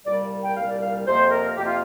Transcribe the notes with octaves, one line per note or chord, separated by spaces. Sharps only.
C2 A#2 G3 D5
G5
C2 A#2 G3 F5
D5
F5
F2 C3 A#3 C5
A#4
F2 C3 A#3 G4
F4